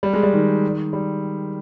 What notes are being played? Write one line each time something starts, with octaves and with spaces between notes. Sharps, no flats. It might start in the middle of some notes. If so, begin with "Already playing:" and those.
G3
G#3
G3
D#3
G3